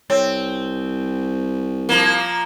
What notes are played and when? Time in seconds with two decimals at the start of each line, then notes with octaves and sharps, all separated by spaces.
0.10 C2 C4 C#5
1.89 F3 A#3